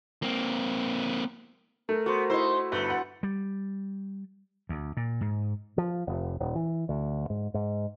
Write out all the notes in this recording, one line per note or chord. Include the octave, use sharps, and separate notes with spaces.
A#3 C4
A3 A#4
B3 F#4 C5
D#4 E4 C5
G1 A3 B4
F#5
G3
D2
A#2
G#2
F3
F1
D#1
E3
D2
G#2
G#2